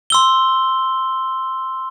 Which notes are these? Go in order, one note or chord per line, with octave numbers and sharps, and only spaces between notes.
C6 E6 G7